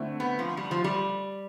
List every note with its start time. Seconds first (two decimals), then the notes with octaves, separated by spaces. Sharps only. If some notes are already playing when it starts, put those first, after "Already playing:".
Already playing: D3 A3 C4 E4
0.20 B3
0.39 F3
0.57 G3
0.71 F3
0.84 G3